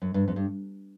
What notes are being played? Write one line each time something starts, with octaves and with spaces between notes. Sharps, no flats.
F#2
G2
F2
G2